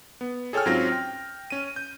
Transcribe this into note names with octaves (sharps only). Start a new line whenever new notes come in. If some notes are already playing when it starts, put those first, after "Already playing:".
B3
G#4 A4 C#5 G5 G#5 F6
G#2 F#3 C4 C#4 F4 A#6
G5
C#4 D#7
G6